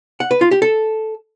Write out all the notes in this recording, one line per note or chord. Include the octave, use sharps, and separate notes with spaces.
F#5
B4
F4
G4
A4